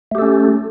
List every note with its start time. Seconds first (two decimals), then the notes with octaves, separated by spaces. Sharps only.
0.11 A3
0.15 G4
0.18 A4
0.22 C#4